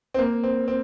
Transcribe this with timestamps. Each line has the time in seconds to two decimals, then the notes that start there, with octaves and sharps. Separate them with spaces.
0.14 C4
0.19 A#3
0.43 C4
0.68 C4